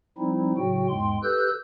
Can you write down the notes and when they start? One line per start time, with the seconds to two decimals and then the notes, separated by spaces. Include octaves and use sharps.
0.18 F3 G3 C4 D#4 E4
0.57 A2 C#3 F#3 F#4 G5
0.88 E2 G#2 G#3 G5 C6
1.23 G4 A4 B4 E6 F#6 G6